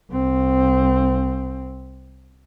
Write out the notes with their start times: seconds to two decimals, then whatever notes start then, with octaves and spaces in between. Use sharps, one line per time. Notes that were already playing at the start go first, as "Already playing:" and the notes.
0.10 C2 C4